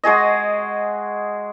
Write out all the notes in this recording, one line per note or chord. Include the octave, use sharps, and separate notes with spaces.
G#3 F#4 G#4 D#5